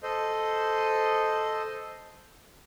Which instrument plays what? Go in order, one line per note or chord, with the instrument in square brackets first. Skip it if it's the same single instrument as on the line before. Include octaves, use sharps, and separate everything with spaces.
[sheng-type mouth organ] A4 C5 D#5